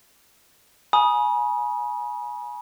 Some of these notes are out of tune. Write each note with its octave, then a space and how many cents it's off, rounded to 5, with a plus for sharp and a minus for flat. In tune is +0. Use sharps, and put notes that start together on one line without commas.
G#5 +20 B5 -40 D#6 +0